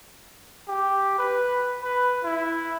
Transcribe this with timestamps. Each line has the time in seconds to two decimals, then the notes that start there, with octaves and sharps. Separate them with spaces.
0.68 G4
1.19 B4
1.83 B4
2.24 E4